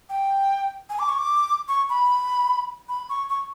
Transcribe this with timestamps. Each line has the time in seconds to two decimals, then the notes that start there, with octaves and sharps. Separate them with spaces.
0.09 G5
0.89 G#5
0.99 D6
1.09 C#6
1.18 D6
1.68 C#6
1.89 B5
2.89 B5
3.09 C#6
3.29 C#6